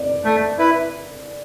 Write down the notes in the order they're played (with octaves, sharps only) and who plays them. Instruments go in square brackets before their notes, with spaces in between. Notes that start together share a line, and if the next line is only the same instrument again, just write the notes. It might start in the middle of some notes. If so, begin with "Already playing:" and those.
Already playing: [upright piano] D5
[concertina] A3
E4 B4